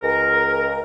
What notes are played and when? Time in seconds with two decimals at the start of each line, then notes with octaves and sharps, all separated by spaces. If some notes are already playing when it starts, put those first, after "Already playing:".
0.03 C#2 A#4